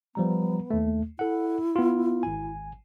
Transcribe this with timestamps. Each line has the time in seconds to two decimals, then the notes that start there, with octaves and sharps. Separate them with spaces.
0.15 F3 G3 B3 A#5
0.70 D#2 A3
1.19 E4 A4 F#5
1.76 B3 F4
2.23 G#1 G#5